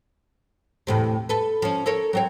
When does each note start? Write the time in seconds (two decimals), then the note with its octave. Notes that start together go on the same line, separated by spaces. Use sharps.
0.87 E2 A2 C3
1.29 A4 B4
1.62 F3 C#4
1.86 A4 A#4 C#5
2.13 F#3 C4 C#5